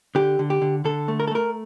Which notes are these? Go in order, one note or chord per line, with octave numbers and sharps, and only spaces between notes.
D3 G4
D3
G4
D3
D3 A4
A3
A#4
A4
A3 A#4